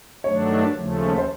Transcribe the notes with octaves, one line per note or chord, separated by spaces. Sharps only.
G2 D#3 F#3 A3 D4 C#5
D#2 C#3 F3 A3
C5